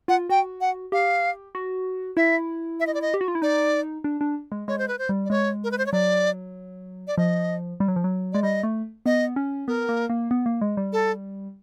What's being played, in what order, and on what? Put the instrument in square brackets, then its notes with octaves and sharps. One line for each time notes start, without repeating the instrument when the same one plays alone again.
[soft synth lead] F4 [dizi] F#5
[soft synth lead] F#4 [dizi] G5
[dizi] F#5
[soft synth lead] G4 [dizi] F5
[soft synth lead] F#4
[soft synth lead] E4 [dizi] E5
[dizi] E5
D#5
D5
D#5
[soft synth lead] G4
F#4
F4
E4
[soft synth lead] D#4 [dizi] D5
[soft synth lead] D4
D4
G#3
[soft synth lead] G#3 [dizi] C#5
[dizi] C5
B4
C5
[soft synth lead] G3
[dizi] D5
[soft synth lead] G#3 [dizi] C#5
[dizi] A#4
B4
C5
C#5
[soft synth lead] F#3 [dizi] D5
[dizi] D5
[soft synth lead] F3 [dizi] D#5
[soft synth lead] G3
F#3
F3
F#3
[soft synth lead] G#3 [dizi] D5
[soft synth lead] G3 [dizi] D#5
[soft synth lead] A3
[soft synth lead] B3 [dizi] D#5
[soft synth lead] C#4
[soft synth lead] B3 [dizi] A#4
[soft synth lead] A#3
A#3
B3
A#3
G#3
G3
[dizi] A4